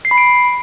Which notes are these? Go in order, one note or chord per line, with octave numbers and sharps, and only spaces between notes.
C7
B5
D7